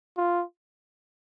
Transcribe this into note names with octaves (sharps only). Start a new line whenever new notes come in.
F4